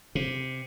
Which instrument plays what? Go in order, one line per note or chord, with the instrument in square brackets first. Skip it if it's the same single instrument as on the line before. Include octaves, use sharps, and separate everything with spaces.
[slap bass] C3